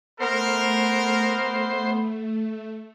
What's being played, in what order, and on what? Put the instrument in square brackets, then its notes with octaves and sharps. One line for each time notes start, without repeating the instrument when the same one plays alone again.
[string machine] A3 [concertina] B3 [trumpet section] A#4 [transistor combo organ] C5